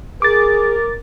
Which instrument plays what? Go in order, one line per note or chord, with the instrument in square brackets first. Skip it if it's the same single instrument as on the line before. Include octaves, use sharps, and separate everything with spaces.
[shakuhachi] G#4 [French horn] A#4 [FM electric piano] D6 A6